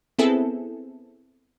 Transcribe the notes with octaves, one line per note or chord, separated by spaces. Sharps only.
B3 C4 E4 G#4 A4